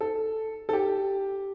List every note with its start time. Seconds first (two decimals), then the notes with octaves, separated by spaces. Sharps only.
0.01 A4
0.69 A4
0.73 G4